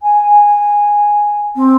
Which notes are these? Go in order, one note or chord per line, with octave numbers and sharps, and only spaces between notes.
G#5
C4